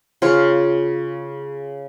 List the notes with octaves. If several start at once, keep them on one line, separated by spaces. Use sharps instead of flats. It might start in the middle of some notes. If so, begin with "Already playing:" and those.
C#3 F4 C#5